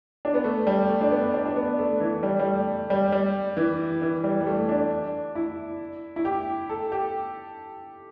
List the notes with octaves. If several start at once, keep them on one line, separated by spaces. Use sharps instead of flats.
D4
B3
A3
G3
A3
D4
B3
D4
D4
B3
A3
E3
G3
G3
A3
G3
G3
E3
E3
G3
G3
A3
D4
E4
E4
G4
A4
G4